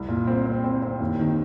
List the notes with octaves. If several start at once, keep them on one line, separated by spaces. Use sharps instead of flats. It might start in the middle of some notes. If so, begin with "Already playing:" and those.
Already playing: C2
A#2
C4
C4
C4
C4
D#2
D#3